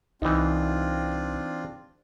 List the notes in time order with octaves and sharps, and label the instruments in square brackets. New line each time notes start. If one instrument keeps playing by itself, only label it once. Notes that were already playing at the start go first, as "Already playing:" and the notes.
[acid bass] C2 [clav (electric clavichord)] E3 D#4 [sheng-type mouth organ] C4 D4 F4